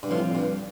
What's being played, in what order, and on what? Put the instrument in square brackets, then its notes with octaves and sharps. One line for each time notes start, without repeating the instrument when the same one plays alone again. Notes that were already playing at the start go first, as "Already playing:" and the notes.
[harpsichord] G2
[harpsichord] A2 [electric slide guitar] F3 C4 F4
[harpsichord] G2